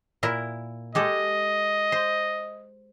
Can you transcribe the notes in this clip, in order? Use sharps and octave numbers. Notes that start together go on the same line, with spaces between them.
A#2 E4 A#4
G#3 G4 A4 D#5
C5